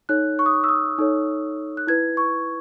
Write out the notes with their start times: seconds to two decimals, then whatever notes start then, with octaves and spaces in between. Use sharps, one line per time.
0.09 D#4 A4 C#5 F#6
0.39 C#6
0.46 D#6
0.54 C#6
0.64 E6
0.69 D#6
0.98 D#4 A4 C#5
1.77 F#6
1.87 E4 B4 G#6
2.17 C#6